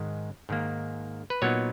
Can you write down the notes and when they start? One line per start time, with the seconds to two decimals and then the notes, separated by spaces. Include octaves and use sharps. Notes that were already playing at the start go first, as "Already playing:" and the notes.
Already playing: G#2 D#3 G#3
0.49 G#2 D#3 A#3
1.30 B4
1.42 A#2 F#3 B3 D#4 C#5